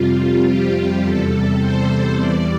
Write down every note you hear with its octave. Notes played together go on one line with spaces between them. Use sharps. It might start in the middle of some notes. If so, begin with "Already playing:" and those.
Already playing: F2 C3 G3 F4
G4
E2 C3 G3 A4
C5
E2 E3 G3 D5